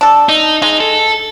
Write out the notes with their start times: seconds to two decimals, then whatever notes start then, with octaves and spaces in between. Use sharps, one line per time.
0.01 D4 A4
0.29 D#4
0.62 G#3 D#4
0.80 A4